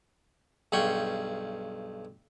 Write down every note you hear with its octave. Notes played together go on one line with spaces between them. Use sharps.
B1 G2 G#4 F#5 G5 C#6